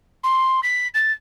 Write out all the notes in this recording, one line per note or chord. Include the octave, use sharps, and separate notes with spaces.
C6
B6
A6